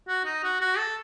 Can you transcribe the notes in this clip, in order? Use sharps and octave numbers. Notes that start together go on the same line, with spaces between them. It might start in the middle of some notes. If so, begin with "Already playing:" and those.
F#4
D#4
F#4
F#4
A4